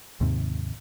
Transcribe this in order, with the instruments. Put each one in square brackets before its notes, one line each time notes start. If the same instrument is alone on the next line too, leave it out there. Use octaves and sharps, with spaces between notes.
[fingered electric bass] D#2 G#2 C3